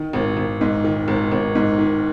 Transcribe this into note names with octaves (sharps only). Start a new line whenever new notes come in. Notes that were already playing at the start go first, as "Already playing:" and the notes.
Already playing: D#3
G#1
G#1
G#2
D#3
G#1
G#1
G#2
D#3